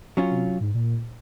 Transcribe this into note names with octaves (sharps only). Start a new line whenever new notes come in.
F#3 C#4 F4
C3
G#2
A#2